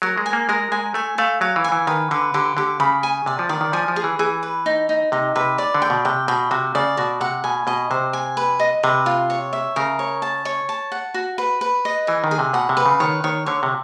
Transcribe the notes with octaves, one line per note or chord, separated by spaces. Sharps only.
F#3 A#4
G#3
G#5
A#3
G#3 A#4
G#3 G#5
A3 G#5
A3 F5
F#3 F5
E3
G#5
E3
D#3 B4
D3 B4
D3 G4
D3 G4
C#3 B5
G#5
C3 D5
F3
D#3 D5
D#3
F3 G#5
F3
G#4
E3
E3 G#4
B4
D#4
D#4
C3 D#4
C3 B4
D5
D3
G5
B2
C3 G5
B2 G5
C3 F#4
C#3 D5
B2 F#4
C3 F#5
B2 G#5
B2 D#5
C3 C5
G#5
B4
D#5
C3 B4
F4
C#5
E5
C#3 A#4
C#5
A5
C#5
A5
F#5
F#4
B4
B4
D#5
E3 G#4
D#3
G#4
C3
B2 F#5
C3
B4
C#3
D#3 C#5
D#3 C#5
D3 C#5
C3